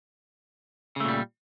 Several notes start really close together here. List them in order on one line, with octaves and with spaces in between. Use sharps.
C#3 A3 A#2 G3